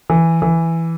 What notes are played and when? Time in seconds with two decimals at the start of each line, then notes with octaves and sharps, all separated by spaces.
0.10 E3
0.42 E3